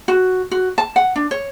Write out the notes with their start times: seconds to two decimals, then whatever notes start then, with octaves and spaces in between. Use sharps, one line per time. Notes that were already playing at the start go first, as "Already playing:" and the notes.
0.08 F#4
0.51 F#4
0.78 A5
0.96 F#5
1.16 D4
1.31 C#5